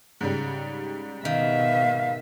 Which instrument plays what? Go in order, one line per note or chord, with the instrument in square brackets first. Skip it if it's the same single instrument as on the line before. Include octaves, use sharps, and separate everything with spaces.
[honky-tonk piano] G#2 C#3 G3
[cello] B2 E5 [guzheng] D#3 [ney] F5